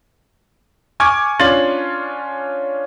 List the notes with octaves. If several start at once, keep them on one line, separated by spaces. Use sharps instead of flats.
G#5 C#6 D6 F6 G#6
C#4 D4 F4 C6 A6 F#7